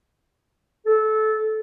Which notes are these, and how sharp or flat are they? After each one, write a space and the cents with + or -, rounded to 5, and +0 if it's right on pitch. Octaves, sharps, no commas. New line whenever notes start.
A4 -20